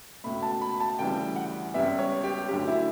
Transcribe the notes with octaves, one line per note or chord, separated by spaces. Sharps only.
C#2 B2 A3 B5
A5
B5
A5
D2 C#3 E3 G3 G5
F#5
C#2 C#3 G3 B3 E5
C#5
G4
D2 D3 F#3 G4
E4